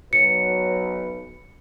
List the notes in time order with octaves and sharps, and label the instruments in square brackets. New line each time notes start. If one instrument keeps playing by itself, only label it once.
[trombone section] B1 F#3 B4 [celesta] C#7